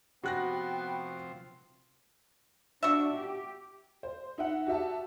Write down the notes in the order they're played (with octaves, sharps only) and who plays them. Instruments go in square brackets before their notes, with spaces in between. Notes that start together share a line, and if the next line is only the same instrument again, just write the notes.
[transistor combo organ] C3 F3 C5 [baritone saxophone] B3 [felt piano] F#4 F#6 A#6 [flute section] G5
[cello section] D4 [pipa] F#4 E5
[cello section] G4
[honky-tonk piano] C5
D#4 E5 F#5
F#4 G4 E5 A5